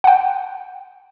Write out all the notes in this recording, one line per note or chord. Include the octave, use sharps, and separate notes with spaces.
F#5 G5